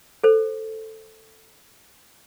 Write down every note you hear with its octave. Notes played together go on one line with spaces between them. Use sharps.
A4 C5